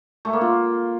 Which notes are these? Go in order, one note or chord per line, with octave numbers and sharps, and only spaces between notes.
A3
A#3
F4